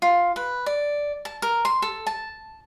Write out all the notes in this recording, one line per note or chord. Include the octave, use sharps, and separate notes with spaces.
F4
B4
D5
A5
A#4
C6
A4
A5